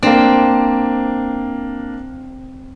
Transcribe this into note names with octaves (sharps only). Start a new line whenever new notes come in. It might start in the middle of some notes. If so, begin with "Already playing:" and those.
A#3 C4 D4